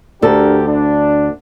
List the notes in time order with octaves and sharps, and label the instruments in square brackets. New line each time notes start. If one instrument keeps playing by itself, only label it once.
[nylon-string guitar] D2 A4 [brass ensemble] D4 G4 A#4
[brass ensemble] D4